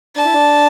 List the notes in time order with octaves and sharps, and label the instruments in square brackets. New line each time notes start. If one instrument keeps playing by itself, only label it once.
[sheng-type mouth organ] D4 [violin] A5
[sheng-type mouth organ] E4
D4